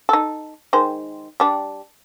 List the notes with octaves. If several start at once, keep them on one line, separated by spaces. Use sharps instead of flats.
D#4 A4
D#3 G#3 C5
G3 D4